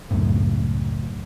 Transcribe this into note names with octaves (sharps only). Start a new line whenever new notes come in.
C#2 F#2 A2